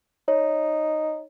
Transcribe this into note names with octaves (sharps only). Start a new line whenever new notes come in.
D#4 C#5